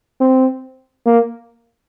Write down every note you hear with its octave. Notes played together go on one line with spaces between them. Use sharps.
C4
A#3